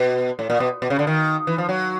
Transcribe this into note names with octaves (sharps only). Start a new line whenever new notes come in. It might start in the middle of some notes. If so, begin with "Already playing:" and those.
Already playing: B2
A2
A#2
B2
B2
C#3
D3
D#3
E3
F3
F#3